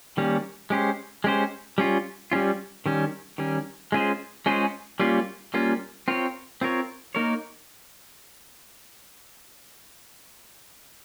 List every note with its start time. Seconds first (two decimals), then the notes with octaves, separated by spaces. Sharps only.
0.17 D#3 G3 A#3 C#4
0.70 G#3 C#4 G4 C5
1.24 G#3 C#4 G4 C5
1.78 G3 C#4 F4
2.32 G3 C#4 F4
2.86 D#3 G3 C#4
3.38 D#3 G3 C#4
3.92 G#3 C#4 F4 G#4 C5
4.46 G#3 C#4 F4 G#4 C5
5.00 G3 A#3 C#4 F4
5.54 G3 A#3 C#4 F4
6.08 C4 F4 A#4 C#5
6.61 C4 F4 A#4 C#5
7.15 A#3 D#4 A#4 C#5